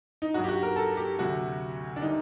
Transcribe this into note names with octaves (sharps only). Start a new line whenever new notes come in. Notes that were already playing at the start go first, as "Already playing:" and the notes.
D#4
G2 F#3 F#4
G4
F#4
A#4
A4
G4
D2 C3 F#3 F#4
D4
C3 D#3 G3 D#4